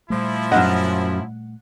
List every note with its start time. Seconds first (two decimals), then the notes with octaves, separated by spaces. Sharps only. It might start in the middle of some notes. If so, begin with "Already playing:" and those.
0.10 A#2 F3 G3 A3 E4
0.52 F#2 C#3 D#5 F#5